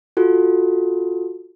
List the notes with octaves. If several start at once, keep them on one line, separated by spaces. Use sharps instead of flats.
F4 F#4 A4